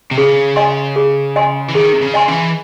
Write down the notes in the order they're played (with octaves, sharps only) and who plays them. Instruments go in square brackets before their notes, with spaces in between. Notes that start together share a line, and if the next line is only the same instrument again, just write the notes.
[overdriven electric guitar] C3
[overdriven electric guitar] C#3 [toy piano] G#4
[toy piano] D#5 G#5 C6
G#4
D#5 G#5 C6
[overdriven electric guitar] E3
[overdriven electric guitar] D#3 [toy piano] G#4
[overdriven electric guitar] C3
C#3
[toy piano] D#5 G#5 C6
[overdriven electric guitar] E3